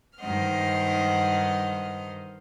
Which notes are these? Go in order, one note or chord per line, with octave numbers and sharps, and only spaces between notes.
G2 D#3 C5 D#5 F#5 F6